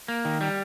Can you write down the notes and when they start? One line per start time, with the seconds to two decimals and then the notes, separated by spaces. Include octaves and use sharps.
0.08 A#3
0.25 D#3
0.41 G3